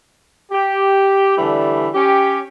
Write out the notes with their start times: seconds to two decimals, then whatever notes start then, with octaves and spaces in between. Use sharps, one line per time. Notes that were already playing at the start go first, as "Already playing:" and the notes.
0.51 G4
1.38 D3 E3 G3 A3
1.94 C#4 G4